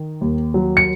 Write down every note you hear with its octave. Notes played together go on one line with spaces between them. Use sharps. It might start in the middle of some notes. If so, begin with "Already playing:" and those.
Already playing: D#3
D#2
F#3
C#7